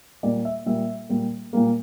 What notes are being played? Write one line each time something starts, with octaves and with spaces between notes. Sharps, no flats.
A#2 G3 A#3 D5
E5
A#2 G3 A#3 E5
A#2 G3 A#3
A#2 G3 A#3